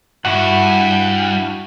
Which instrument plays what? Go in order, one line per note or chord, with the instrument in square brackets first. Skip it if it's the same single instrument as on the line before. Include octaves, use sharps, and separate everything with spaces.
[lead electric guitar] G2 [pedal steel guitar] E4 F#4 F#5